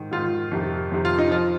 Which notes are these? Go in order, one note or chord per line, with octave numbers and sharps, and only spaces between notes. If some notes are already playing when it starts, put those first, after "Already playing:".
Already playing: G#2 D#3
G#2 D#3 F4
F2 C3 D#3
F2 C3 D#3
F4
D#4
F3 F4